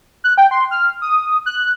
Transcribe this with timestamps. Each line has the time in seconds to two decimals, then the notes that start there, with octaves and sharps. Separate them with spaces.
0.24 F#6
0.38 G5
0.51 C6
0.71 F6
1.02 D#6
1.46 F#6